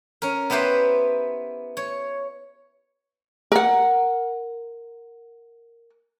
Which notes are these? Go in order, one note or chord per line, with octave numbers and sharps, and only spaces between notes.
C#4 A#4
B3 E4 G4 B4 C5
C#5
A#4 F#5